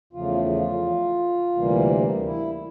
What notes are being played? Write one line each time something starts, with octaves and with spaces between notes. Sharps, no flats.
E2 C#3 F3 A3 F4
F4
D2 C3 E3 G3 A#3
E4